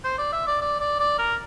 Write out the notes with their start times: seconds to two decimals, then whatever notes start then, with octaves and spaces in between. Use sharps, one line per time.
0.04 C5
0.18 D5
0.32 E5
0.47 D5
0.61 D5
0.80 D5
0.99 D5
1.18 A#4